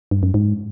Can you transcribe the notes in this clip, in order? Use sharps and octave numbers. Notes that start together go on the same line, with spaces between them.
G2
F#2
G#2